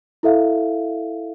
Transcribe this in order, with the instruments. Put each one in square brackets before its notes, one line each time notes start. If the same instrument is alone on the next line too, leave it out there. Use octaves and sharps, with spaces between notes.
[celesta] E4 A4 E5 F5